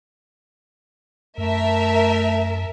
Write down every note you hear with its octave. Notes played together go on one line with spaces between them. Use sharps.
F#2 A3 A#4 E5 A5